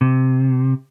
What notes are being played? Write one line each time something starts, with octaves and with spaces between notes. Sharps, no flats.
C3